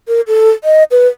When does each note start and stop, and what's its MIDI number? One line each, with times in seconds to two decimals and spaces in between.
0.08 0.21 70
0.27 0.51 69
0.64 0.84 75
0.91 1.07 71